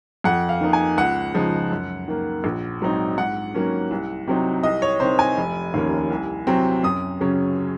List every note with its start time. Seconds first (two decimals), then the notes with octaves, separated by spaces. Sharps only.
0.24 F2 F#5
0.49 F5
0.61 D#3 A#3 D#4
0.73 G#5
0.97 C#2 F#5
1.34 C#3 F3 G#3 D#4
1.71 F#2
2.08 D#3 A#3
2.44 A#1
2.81 G#2 F#3 C4 D#4
3.18 G#2 F#5
3.54 D#3 F#3 A#3 C#4
3.91 C2
4.27 C3 F#3 C4 D#4
4.63 C2 D#5
4.82 C#5
5.00 C3 D#3 C5
5.19 G#5
5.37 F1
5.74 D#2 D#3 A#3 C#4
6.11 C2
6.47 C3 F#3 C4
6.83 F#2 D#6
7.21 C#3 F#3 C#4